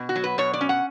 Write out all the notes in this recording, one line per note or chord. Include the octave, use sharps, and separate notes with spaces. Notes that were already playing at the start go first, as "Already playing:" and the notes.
Already playing: B2
F#4
F#3
B4
B2 C#5
D5
C#4
F#5